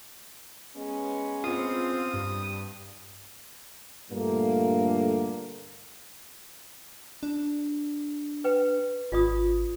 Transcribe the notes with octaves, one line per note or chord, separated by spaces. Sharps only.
G#3 B3 C#4
C4 F4 D#6
G2
G2 A#2 D3 A3 A#3
D4
B4 G5
G#1 F4 D5 D#6